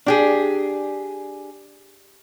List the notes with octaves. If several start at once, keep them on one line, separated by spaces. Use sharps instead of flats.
D4 G4 G#4